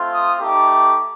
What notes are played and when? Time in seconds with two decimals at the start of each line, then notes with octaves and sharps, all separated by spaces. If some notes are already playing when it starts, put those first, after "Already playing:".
Already playing: A3 C4 F4
0.11 D#6
0.40 A3 D#4 G4 D6